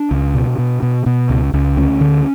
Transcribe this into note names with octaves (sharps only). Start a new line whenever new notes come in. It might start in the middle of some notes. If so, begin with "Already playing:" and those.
Already playing: D4
C#2
B2
B2
B2
B2
C#2
C#2
D2 C#4
D3